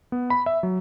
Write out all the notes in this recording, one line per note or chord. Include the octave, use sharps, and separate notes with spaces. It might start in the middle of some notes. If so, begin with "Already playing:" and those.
B3
B5
E5
F#3